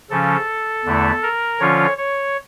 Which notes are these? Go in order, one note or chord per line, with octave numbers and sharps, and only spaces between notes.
C#3 F3 C#4 A4
E2 D3 A3 E4
A#4
D3 F3 C#4 F4 C#5
C#5